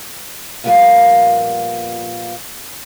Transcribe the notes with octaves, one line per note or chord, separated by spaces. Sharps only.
A#2 F3 G3 A#3 B3 F4